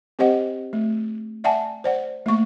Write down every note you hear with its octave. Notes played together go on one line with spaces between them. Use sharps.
C4 G4 C5 D#5 F#5
A3
D5 E5 F#5 G#5 A5
C5 D5 F#5
A3 A#3 C#6